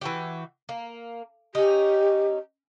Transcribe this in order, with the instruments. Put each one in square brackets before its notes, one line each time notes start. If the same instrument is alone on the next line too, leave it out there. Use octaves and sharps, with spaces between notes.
[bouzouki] E3 F#4 G4
A#3
[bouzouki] C#4 D#4 [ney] G4